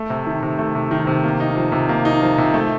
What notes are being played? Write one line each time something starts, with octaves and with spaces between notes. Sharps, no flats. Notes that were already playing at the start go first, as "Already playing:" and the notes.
Already playing: A3
C3
D#3
C3
A3
C3
D#3
C3
A#3
D#4
F3
C3
A#3
D#4
F3
C3
A3